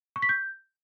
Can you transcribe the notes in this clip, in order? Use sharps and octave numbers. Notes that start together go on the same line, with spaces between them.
C#6
B6
G6